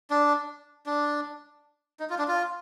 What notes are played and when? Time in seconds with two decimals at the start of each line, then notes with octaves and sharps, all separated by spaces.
0.10 D4
0.86 D4
2.00 D#4
2.10 F4
2.19 D4
2.28 F4